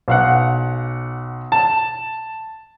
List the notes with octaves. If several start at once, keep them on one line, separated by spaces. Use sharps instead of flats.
B1 F5 F#5
A5